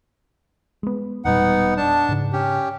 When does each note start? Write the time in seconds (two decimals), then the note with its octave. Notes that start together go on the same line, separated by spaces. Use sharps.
0.83 G#3 B3
1.25 E1 A#2 G3 B3 D#4 F#5
1.77 D4 A5
2.09 G#2 C#3
2.33 C#4 G4